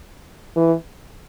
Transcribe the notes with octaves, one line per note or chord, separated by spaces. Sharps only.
E3